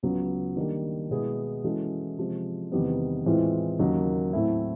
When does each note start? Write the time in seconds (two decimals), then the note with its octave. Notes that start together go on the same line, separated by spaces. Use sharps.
0.03 C#2 C#3 F#3 B3
0.57 D#3 G3 A#3 D4
1.10 B2 G#3 B3 E4 G#4
1.64 E3 G#3 C#4 F#4 A4
2.18 C3 F3 G#3
2.72 E2 C3 D#3 G3 B3
3.26 A2 E3 G#3 C4 F4
3.79 D#2 C#3 F#3 A#3 D#4
4.33 A2 F#3 A3 C4 E4